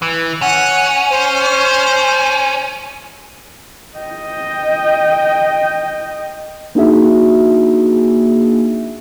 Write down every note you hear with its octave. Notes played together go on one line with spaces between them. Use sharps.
E3
C#4 F#5
C5
D#5 G5
A#3 D4 D#4 F#4 G#4 E5